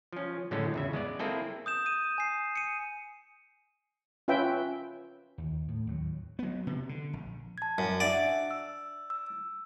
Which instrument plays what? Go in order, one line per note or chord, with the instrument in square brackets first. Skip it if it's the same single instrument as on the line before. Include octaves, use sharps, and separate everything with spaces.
[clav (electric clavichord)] F3 C#4
A2 D3 F#3 G#3 C#4 A4
E2 C#3 E5
G#3 B3 D5
A#3 C4 E4 G#4 A4 G5
[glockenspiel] D#6 G6 E7
D#6 D#7
G#5 C7
C#7 D#7
[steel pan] C#4 F4 B4 E5 G5
[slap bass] D#2
A2
D#2 F#3
F#3 B3
C3 B3
D3
A#1
[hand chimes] A5 G#6
[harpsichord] F#2
[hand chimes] D4 E5 F#5 [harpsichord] D5
[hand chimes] E6
E6